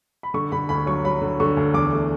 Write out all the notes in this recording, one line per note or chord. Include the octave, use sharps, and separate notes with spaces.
B5
D3 C#6
D3 B5
D2 B5
F#3 C#6
F#3 B5
D3
D3 C#6
D2
E2 D6
A3